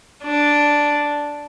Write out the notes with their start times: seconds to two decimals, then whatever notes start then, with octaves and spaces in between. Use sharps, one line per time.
0.24 D4